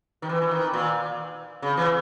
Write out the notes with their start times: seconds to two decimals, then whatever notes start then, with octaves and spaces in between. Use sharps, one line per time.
0.22 D#3
0.29 E3
0.42 E3
0.51 D#3
0.73 A#2
1.62 C#3
1.77 E3